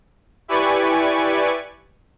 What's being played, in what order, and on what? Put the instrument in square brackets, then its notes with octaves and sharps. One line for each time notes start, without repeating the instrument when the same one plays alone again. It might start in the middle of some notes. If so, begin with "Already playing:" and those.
[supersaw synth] E4 G4 B4 D5 G#5 C#6